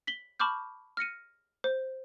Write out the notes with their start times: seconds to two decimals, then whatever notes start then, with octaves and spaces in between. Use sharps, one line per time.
0.07 B6 F#7 G7
0.39 A5 B5 C#6 D6 F6 G6
0.97 F6 A#6 C#7 D#7
1.64 C5